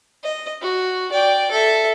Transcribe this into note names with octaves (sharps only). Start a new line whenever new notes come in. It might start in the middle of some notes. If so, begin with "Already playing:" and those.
D#5
F#4
D5 G5
A4 E5